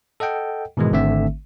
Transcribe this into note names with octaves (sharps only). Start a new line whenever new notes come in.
A4 D#5 F#5 G5
G#2 B2 D#3 E3 G#3
G#1 D3 A3 C4 E5